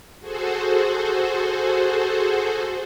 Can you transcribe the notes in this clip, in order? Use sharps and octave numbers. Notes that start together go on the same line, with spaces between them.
F#4 G#4 A4 C5